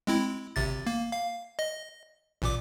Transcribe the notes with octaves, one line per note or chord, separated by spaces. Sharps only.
G#3 C4 E4
G#1 C3 A6
A#3
F5
D#5
A1 A#2 D6